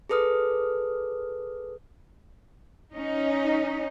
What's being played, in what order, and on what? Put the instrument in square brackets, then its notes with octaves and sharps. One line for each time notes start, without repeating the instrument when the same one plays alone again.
[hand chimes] G#4 A4 B4 D#6 F6
[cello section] C#4 D#4